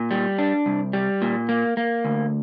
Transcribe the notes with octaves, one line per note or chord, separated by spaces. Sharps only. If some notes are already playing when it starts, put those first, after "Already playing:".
Already playing: A#2
G3
D4
C2
G3
A#2
A#3
A#3
D2